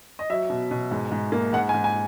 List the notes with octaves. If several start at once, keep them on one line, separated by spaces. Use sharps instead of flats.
D#5
F#3 E5
B2
B2
G#2
G#2
A#3
G#2 F#5
G#5
G#2
G#5